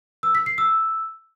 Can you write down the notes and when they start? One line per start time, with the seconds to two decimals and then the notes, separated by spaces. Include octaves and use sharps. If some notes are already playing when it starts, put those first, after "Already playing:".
0.23 E6
0.35 B6
0.46 C7
0.58 E6